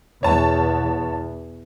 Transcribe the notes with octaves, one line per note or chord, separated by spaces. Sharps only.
E2 B2 C#5 A5